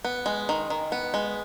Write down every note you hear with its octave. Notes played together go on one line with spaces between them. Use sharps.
B3
G#3
D#3
D#3
B3
G#3